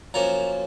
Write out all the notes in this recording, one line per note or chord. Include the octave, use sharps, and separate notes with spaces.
F#2 F3 A#3 C#4 A#5